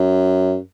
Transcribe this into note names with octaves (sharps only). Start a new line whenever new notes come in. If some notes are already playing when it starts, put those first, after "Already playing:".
Already playing: F#2